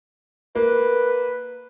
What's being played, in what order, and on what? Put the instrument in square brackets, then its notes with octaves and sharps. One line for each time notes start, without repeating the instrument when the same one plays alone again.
[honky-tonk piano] A#3 [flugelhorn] B4